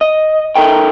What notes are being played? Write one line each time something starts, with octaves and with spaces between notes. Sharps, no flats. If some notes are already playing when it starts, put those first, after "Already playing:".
D#5
D#4 A4 A#4 G5